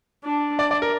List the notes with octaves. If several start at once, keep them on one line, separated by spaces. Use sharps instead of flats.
D4
D5
D5
A#4